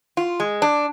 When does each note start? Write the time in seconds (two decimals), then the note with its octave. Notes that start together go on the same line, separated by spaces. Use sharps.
0.17 F4
0.40 G#3
0.62 D4